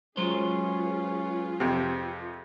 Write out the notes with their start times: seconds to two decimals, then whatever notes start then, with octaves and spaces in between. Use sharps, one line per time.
0.17 F#3 G#3 C#4 F4 G#4 B4 C5
1.60 F2 C3